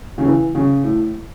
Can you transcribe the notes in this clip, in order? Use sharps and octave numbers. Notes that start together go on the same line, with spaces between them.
C#3
E3
C#3
A2